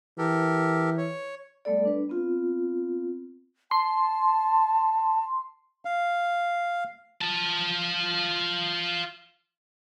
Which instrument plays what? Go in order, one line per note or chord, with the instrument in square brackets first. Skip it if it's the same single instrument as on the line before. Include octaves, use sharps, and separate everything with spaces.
[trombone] E3 [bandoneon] G4 A4 A#4
[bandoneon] C#5
[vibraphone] G3 A3 B3 A4 D5
D4 B4
B3 C4 F4
[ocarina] A5 [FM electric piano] C6
[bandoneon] F5
[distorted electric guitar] F4 A5